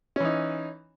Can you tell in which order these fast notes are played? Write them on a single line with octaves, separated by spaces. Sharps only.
C#4 E3 D#4